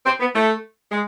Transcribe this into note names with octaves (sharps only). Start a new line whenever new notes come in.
C4
B3
A3
G#3